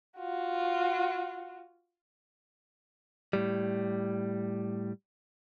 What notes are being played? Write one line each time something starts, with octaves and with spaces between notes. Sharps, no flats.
F4 F#4
A2 G3